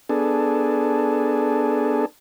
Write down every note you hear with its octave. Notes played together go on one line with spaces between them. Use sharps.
B3 D4 G#4 A4